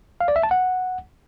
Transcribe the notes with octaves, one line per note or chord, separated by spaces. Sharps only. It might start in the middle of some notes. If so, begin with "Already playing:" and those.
F5
D5
E5
A5
F#5